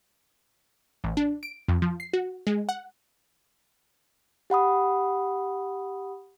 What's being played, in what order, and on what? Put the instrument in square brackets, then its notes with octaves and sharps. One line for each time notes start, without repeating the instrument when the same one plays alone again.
[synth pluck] A1
D4
D7
F2
F3
C7
F#4
G#3
F#5
[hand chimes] G4 F#5 B5 D#6